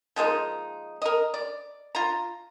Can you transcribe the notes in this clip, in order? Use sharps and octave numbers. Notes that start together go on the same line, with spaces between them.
F3 G#3 A#3 D#4
A#4 D#5
D5
F4 A#5